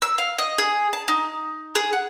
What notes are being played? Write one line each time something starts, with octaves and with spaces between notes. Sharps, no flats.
E6
F5
D#5
G#4
A5
D#4
G#4
F#5